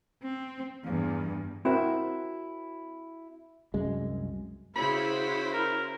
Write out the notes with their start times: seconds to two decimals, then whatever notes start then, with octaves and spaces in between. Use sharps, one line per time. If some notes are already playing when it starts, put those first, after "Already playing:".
0.23 C4
0.85 E2 G2
1.65 C4 E4 F#4 A#4 C5
3.74 C2 F#2 G#3
4.76 C#3 C#4 E4 F#4 C5 B5
5.53 A#4